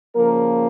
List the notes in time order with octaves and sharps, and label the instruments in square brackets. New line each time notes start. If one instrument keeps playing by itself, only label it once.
[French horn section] C#3 F3 A#3 A#4